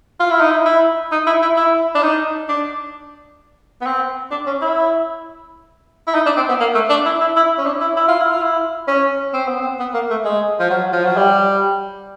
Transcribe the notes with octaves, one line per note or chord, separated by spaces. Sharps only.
F4
E4
D#4
E4
E4
D#4
E4
E4
E4
D4
D#4
D4
B3
C4
D4
C#4
E4
E4
D#4
D4
C4
B3
A#3
A3
D4
E4
E4
E4
C#4
D4
E4
E4
F4
E4
F4
E4
C#4
C4
B3
C4
B3
A#3
A3
G#3
F3
F#3
F3
F#3
G3